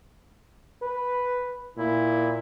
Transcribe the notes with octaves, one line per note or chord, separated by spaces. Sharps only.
B4
A#2 E4